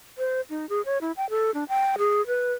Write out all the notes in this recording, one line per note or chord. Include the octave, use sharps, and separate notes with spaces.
C5
D#4
G#4
C#5
E4
G5
A4
D4
G5
G#4
B4